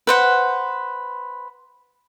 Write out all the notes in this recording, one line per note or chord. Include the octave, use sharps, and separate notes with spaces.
B4 C5 F#5